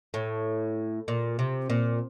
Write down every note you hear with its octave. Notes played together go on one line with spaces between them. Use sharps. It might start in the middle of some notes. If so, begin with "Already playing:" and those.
A2
A#2
C3
A#2